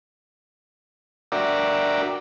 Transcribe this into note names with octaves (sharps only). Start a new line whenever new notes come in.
D4 F#4 A#4 D5 E5 G5